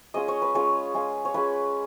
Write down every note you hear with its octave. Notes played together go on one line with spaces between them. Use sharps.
G#3 C#4 F4 D#5
C#5
B4
G#3 C#4 F4 C#5
G#3 C#4 F4
C#5
G#3 C#4 F4 B4